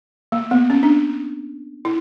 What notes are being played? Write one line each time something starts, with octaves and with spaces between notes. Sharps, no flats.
A#3
B3
C#4
D4
E4